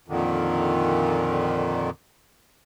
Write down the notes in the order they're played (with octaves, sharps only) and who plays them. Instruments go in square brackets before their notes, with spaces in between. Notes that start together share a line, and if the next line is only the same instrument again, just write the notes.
[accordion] F2 A#2 D3 D#3